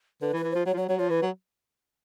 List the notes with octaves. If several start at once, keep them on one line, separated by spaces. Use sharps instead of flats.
D3 B4
E3
B4
E3
F3 C5
F#3 C#5
F3
F#3 C#5
F#3 C#5
F3 C#5
E3 B4
F#3